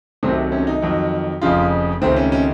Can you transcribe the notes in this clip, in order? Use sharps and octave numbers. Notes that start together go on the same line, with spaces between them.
C2 C3 D#3 F#3 A3 C4
C#4
D#4
F2 D#3 F#3
F1 F2 C#3 F4
C#2 C3 D#3 A3 C4
C#4
C#4